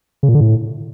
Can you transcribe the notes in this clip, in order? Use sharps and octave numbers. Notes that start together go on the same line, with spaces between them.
C#3
A#2
D3
A2